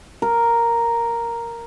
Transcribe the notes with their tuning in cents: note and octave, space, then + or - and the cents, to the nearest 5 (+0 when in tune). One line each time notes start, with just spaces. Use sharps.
A#4 +0